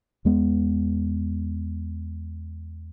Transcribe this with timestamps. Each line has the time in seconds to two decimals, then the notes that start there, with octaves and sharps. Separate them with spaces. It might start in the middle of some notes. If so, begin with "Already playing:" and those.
0.25 E2 G#3 B3